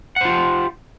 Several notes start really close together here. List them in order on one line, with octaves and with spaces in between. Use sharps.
F#5 C5 F4 G4